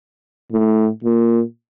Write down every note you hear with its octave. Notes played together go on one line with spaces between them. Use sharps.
A2
A#2